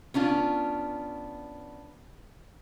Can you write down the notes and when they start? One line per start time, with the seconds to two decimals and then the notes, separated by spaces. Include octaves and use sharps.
0.14 B3 C#4 D4 F4